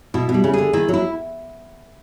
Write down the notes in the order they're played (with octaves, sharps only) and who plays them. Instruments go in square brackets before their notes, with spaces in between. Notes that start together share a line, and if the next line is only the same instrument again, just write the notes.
[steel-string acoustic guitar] B2 [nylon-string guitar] E4
[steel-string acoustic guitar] B2
[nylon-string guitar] G3
[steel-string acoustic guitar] C#3
[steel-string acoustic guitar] D3 [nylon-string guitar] G#4
[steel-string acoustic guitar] D#3 [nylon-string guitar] E4
[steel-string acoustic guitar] F#3
[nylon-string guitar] E4